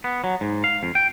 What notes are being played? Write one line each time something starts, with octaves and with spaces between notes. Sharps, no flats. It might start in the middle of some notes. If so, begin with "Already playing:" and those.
B3
F#3
G#2
F5
F2
G5